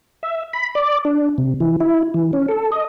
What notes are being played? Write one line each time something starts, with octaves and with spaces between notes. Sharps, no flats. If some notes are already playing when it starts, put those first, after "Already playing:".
E5
B5
D5
D4
C3
E3
E4
E3
C#4
A4
D#5